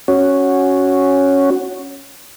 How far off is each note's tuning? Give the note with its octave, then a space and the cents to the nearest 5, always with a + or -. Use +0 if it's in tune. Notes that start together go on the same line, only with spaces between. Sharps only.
C#4 +0 F#4 +0